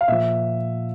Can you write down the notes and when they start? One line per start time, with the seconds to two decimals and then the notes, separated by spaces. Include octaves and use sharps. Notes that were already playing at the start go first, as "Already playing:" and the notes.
0.01 F5
0.08 A#2 F3 E5